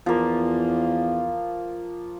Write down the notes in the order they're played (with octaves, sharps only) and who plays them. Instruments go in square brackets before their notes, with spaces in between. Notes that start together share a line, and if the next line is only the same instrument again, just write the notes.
[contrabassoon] E2 [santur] F3 A#3